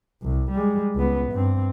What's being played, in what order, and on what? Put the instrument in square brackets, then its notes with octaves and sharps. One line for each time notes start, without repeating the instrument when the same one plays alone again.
[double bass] C2
G3 G#3
C#2 B3
G2 C4